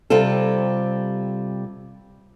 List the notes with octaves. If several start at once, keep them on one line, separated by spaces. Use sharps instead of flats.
C3 G3 C4 F4 A4